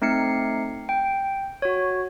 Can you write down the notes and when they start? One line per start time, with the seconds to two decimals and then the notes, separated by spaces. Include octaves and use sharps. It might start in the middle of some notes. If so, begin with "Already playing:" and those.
0.02 A3 C4 D#4 C7 C#7
0.89 G5
1.62 F#4 C#5